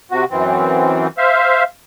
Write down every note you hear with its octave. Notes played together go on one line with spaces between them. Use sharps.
C3 F#4
F#2 E3 C4
C5 E5 F5